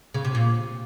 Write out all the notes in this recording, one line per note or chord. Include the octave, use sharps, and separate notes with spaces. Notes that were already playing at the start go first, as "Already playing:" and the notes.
C#3
C3
A#2